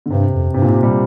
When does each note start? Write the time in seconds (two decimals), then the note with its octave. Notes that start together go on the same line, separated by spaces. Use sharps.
0.06 D3
0.11 G2 C3
0.33 F2
0.54 G2 C3
0.62 A#2
0.68 G#2 C3
0.83 A#2 G3